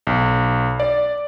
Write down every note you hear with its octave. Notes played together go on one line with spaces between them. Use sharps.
B1
D5